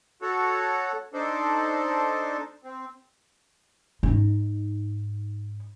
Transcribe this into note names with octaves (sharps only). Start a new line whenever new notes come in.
F#4 A4 C#5
D4 D#4 A4 C5 D5
C4
G#2 D#4